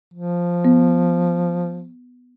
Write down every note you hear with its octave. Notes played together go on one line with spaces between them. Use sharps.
F3
B3